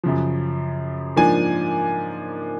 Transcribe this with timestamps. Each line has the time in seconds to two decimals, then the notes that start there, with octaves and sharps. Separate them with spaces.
0.04 F#2 C#3 F3
1.16 G#2 F3 A#3 D4 G#5